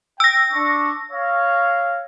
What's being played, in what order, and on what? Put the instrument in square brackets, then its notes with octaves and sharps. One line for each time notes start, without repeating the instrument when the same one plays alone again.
[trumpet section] G5 [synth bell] E6 A#6
[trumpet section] D4 C#6
C#5 F5